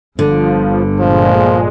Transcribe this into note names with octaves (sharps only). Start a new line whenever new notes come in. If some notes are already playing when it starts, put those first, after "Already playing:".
G1 G2 D3 F3
A#2 F3 G#3